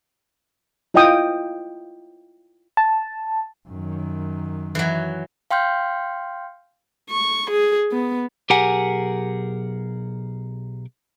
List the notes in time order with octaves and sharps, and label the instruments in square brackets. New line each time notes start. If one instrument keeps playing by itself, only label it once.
[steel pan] E4 F4 D#5 F5 G5 D#6
[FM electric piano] A5
[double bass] F#2 D#3
[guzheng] E3 F#3
[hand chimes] F5 G5 C6 F6 G6
[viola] C#6
G#4
B3
[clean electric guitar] B1 G4 G#4 A#4 F#5 G#5